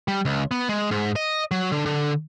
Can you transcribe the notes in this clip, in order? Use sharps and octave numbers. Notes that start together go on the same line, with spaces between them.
G3
C#2
B3
G#3
G#2
D#5
F#3
D3
D3